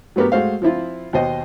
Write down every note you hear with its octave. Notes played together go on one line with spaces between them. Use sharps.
F#3 A3 B3 G4 A#4
G#3 A3 F#4 C5 F5
F3 C4 E4 F4
D#2 B2 C5 D#5